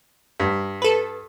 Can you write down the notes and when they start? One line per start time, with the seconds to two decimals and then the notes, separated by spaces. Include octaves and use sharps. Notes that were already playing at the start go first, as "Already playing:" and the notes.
0.40 G2
0.82 A4 B4